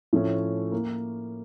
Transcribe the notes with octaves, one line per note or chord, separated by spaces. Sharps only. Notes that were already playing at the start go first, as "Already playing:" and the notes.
A2 F3 A3 C#4
A#3